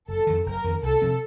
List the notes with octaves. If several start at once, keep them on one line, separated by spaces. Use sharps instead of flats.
F#1 A4
F2 D#3
F#1 A#4
F2 D#3
C2 A4
C3 F3 C4